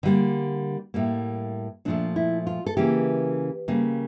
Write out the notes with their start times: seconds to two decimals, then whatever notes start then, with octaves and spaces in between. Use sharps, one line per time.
0.03 D3 G3 A#3
0.94 A2 G3 A#3
1.85 A#2 F3 A3 D4
2.16 E4
2.47 F4
2.66 A4
2.77 C#3 E3 A#3 G4
3.68 C#3 G3 A#3